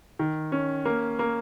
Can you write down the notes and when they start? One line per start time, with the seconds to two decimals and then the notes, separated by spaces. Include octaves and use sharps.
0.19 D#3
0.52 C#4
0.85 A#3
1.19 A#3